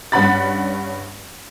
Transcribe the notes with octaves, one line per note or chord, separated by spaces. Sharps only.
G2 C#4 F#5 B5 A6